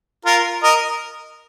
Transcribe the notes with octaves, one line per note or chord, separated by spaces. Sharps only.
F4 A#4
A#4 D#5